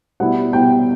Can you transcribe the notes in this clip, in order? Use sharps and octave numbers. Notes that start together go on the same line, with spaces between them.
B2 G3 B3 E4 F#5
B2 G3 B3 E4 G5